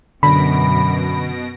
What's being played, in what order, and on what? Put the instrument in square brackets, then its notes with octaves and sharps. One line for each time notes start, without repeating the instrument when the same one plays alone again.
[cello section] F#2 [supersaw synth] B2 A#6 D7 [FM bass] D3 [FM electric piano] B5